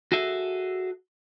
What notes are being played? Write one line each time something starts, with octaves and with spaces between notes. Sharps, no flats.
F#4 G#4 A4 E5